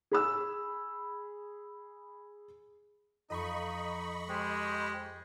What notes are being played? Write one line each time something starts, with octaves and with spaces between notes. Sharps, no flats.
G#4 B5 E6
F2 D#4 D#5 B5 C#6
G#3 G4 C5